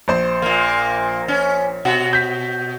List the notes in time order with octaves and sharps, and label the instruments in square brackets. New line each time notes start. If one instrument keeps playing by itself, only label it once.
[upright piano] A#1 C5 C6
[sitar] A#2 A#3
C#4
B2 F#4
[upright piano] G6 B6